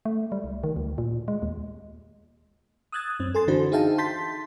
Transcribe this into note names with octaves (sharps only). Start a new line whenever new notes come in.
A3
G3
C2
D#3
D2
A#2
G#3
D#2
D#6 E6 F#6 G#6 A6
F#2 C4
A4 G#5 C6 A6
D3 E3 D4 F#4 C5
D#4 G#4 E5 F5 G5 A5
A5 C6 G6 A6 B6